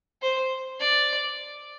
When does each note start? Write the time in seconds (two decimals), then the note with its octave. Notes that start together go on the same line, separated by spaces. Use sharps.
0.22 C5
0.80 D5